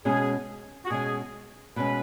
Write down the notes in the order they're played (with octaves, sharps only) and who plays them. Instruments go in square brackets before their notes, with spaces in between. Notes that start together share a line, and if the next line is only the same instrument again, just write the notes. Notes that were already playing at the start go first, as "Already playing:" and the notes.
[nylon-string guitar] B2 G#3 C#4 [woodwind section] G#4
[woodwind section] F#4
[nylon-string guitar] B2 G#3 C#4 [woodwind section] G#4
[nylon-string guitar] B2 G#3 C#4 [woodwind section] B4